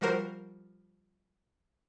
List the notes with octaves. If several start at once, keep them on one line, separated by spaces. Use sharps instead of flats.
F3 G3 F#4 A#4 C5